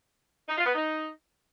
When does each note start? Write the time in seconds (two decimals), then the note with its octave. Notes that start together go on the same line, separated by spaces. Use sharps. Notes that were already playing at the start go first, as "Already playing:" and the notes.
0.49 D#4
0.57 F4
0.66 B3
0.75 D#4